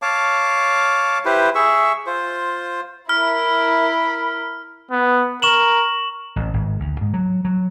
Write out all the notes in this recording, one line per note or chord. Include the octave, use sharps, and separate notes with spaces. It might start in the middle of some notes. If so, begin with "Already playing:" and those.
C#5 F5 A5 D6
E4 G4 B4 C5
G#4 E5 C#6 E6
F4 C5
E4 A#4 B5 F6
B3
A#4 C#6 E7 F#7
A1
G#1
D2
G#2
F#3
F#3